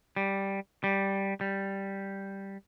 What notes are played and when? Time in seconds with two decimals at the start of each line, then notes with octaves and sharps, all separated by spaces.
0.16 G3
0.84 G3
1.41 G3